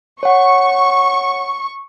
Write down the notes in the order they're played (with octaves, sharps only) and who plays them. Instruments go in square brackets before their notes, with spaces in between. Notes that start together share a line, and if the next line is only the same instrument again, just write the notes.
[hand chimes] C#5 F#5 [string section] C#6